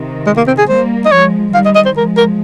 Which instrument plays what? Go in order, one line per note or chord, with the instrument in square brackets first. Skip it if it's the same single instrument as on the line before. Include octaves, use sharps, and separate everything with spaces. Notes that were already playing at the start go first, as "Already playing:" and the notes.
Already playing: [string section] C3 D#3
[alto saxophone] G#3
A#3
C4
G#4
[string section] G3 A#3 [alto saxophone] C5
[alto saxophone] D#5
[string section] F3 G#3 [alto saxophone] C#5
[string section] D#3 G3 [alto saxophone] F5
[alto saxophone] D#5
D#5
C5
[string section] F3 G#3 [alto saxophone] A#4
[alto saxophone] A#4